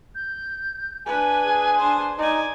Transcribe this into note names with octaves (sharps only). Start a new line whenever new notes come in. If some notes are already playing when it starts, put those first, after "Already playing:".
G6
D4 B4 G#5
G#4
D4 C5
D#4 D5 G#5